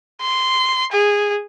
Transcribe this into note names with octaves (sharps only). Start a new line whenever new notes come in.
C6
G#4